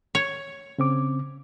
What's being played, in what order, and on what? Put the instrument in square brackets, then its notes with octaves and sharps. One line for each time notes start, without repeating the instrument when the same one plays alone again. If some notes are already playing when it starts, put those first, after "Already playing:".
[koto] C#5
[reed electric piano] C#3 C4 D6